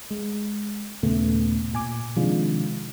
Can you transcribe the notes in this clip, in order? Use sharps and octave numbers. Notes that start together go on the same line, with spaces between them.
G#3
D#2 A#2 C#3 A3 B3
A#2 G#5 D6
C3 D#3 F3 G#3 D4 F4